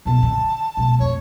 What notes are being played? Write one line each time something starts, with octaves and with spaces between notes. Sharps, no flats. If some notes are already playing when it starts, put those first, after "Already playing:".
B1 B2 A5
D3
B2 G#3
F2 A3 C#5